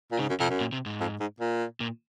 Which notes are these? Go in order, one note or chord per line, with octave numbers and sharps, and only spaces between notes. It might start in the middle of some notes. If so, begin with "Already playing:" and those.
A#2
G#2 C#3
F#2
F2 C3
F#2
A#2
C3
G#2
F2
G#2
A#2
A#2